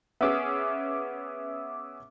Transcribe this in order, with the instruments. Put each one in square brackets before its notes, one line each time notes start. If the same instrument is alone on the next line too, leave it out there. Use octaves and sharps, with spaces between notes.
[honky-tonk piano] B3 C#4 G#4 [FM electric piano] E5 D6 E6